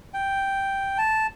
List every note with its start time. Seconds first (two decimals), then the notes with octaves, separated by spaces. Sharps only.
0.14 G5
0.98 A5